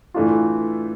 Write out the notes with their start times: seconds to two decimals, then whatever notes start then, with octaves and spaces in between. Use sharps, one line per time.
0.14 A2 E3 A3 D4 F4